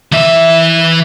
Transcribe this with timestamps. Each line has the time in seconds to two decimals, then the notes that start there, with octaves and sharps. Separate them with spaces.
0.12 E3 E5